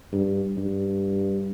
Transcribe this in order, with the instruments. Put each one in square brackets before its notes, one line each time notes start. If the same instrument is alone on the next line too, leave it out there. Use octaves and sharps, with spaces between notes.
[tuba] G2
G2